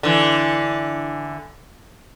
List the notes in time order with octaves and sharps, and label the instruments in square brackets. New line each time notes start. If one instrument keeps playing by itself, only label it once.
[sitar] D3 E3